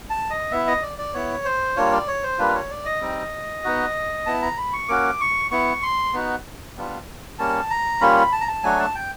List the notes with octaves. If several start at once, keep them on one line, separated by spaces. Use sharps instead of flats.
A5
D#5
B3 E4 E5
D#5
D5
D5
B3 E4 C#5
C5
G3 A#3 D4 F4 C#5
D5
C#5
C5
G3 A#3 D4 F4 B4
C#5
D5
D#5
G3 C4 D#4
B3 D#4 F#4
B3 E4 A5
A#5
B5
C#6
A#3 C#4 F#4 D6
C#6
B3 E4 C#6
C6
B3 D#4 F#4
G3 B3 D4 F4
G3 A#3 C#4 A5
A#5
G3 A#3 C#4 F4 B5
B5
A5
A#5
A5
F#3 A3 D4 F#4 G#5
A5
G5